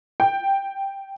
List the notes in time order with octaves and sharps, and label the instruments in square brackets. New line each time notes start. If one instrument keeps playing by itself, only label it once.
[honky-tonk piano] G5